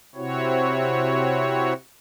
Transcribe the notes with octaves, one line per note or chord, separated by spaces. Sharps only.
C3 C4 E4 F#4 C#5